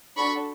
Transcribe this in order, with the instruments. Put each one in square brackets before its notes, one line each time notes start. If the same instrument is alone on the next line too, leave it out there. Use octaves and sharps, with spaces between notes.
[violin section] D4 F#4 A4 B5 C#6